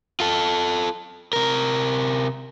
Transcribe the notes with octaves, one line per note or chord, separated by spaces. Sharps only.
F4 A4
C3 A#4